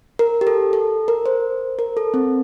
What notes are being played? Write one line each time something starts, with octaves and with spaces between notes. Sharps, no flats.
A#4
G4
A4
A4
A#4
C5
A#4
A4
C4